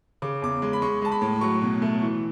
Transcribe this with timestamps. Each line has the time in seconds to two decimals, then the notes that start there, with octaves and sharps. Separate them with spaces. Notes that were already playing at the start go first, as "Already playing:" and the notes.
0.22 C#3 D6
0.42 E2 D6
0.62 G#3
0.73 B5
0.82 G#3 C#6
1.02 G#3 A5
1.12 B5
1.22 A2
1.41 F#3 C#6
1.62 B2
1.82 A3
2.02 E3